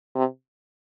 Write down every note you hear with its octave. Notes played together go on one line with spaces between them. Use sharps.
C3